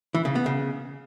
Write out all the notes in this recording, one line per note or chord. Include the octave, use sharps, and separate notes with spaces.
E3
C#3
B3
C#3